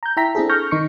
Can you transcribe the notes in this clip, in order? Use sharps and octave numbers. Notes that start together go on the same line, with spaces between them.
A#5 G6
E4 E5 G5 A#5 B6
C4 D4 E4 G#4 A4
C#6 F6 G6 A#6
D#3 D#4 C#6 C#7